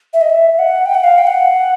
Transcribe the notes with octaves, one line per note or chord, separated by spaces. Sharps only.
E5
D#5
E5
F#5
G5
F#5
F5
G5
F#5